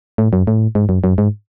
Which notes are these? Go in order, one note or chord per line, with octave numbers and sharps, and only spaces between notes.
A2
F#2
A2
G#2
F#2
F#2
G#2